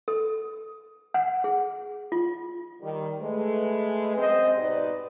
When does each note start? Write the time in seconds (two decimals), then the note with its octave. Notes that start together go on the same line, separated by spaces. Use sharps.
0.08 A4
1.14 F#5
1.44 G#4
2.12 F4
2.81 D#3 G3 A#4
3.21 G#3 A3 B4
4.18 F#2 C4 G#4 C5 D#5
4.57 G#2 B2 D#4 G4 B4 D5